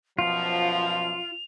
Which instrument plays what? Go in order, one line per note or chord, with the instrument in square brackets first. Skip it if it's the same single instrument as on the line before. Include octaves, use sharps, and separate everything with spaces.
[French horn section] F#2 B2 F3 [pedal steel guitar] F4 [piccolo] F7